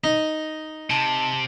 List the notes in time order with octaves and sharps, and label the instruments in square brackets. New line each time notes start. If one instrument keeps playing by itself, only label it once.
[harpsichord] D#4
[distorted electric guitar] C3 [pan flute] A5